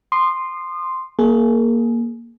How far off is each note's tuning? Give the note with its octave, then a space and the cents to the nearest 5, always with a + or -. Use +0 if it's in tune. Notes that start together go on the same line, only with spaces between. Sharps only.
C6 +0 D#6 -35
A#3 +0 G#4 +25